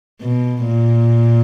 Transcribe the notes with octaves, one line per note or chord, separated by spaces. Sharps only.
B2
A#2